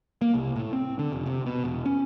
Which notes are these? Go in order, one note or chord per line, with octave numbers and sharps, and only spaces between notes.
A#3
C2
A2
C4
D3
F1
C3
B2
E1
C#4